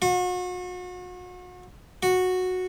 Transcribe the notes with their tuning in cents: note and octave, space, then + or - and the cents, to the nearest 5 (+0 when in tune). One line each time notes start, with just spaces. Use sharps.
F#4 -40
F#4 -10